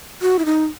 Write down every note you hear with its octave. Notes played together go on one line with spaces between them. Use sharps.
F#4
E4
D#4